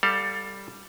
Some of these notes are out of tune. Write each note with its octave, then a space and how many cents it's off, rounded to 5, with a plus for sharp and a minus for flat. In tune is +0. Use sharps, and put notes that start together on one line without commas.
G3 +0 A4 +20 F5 +30